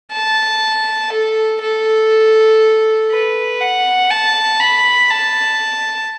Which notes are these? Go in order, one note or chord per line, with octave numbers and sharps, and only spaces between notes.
A5
A4
A4
B4
F#5
A5
B5
A5